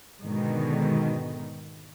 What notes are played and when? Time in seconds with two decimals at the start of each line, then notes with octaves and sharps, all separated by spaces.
0.25 G#2 B2 D3 D#3